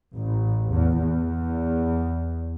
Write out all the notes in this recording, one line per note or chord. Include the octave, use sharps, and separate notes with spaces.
A1
E2
E2